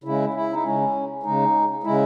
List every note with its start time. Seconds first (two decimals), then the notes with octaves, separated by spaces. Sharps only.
0.04 C#3 G#3 E4
0.34 E4
0.53 D#4
0.63 C#3 G#3 C#4
1.23 C#3 G#3 D#4
1.83 C#3 G#3 E4